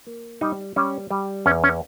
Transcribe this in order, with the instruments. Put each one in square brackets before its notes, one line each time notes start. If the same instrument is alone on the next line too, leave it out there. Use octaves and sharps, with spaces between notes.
[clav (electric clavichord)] A#3
G3 D#4
G3 C#4
G3
E2 C#4
C#4